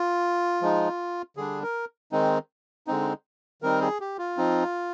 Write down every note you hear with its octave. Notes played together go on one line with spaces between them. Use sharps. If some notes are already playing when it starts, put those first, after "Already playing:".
Already playing: F4
F3 G#3 D#4
D3 G3 D4 G#4
A#4
D#3 G#3 C4 D#4
D3 G#3 C4 D#4
D#3 G3 C4 D#4 A#4
G#4
G4
F4
F3 C4 D#4